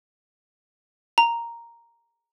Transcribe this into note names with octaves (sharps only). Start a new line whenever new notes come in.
A#5